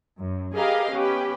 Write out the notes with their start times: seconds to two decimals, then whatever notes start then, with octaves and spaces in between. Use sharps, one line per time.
0.18 F#2
0.56 G4 G#4 A#4 B4 D#5 F5
0.92 B3 C#4 G4 B4